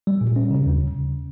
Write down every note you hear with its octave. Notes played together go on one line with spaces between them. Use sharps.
G3
A#2
C#4
C#3
D#2